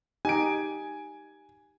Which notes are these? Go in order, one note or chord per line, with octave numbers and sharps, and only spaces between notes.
D#4 G4 G#5 D7